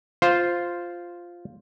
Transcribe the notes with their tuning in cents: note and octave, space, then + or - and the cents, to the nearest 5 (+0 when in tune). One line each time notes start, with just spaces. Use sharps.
F4 +0 C5 +0